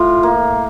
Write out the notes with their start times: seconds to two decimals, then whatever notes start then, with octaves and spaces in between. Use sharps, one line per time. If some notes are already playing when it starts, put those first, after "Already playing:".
Already playing: A2 F4
0.23 A#3